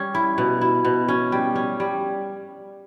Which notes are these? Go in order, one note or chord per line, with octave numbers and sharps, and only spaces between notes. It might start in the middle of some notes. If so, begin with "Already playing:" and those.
Already playing: G3 C#4
E4
B2
E4
B2
C#4
G3
C#4
G3